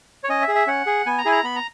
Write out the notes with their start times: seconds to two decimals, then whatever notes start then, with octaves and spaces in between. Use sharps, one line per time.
0.24 C#5
0.29 C#4 D#5
0.42 E5
0.48 G#4
0.55 E5
0.67 C#4 F#5
0.87 G#4
1.06 B3 G#5
1.18 A#5
1.25 E4 G#4 G#5
1.32 A#5
1.44 B3 B5
1.56 A#5